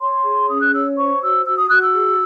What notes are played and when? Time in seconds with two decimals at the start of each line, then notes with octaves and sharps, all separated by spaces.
0.01 C#5 C6
0.25 G#4
0.48 C#4 D#6
0.61 F#6
0.73 C#5 E6
0.97 C5 C#6
1.21 F#4 E6
1.45 F#4 E6
1.57 D#6
1.69 F#4 F#6
1.81 E6
1.93 G#4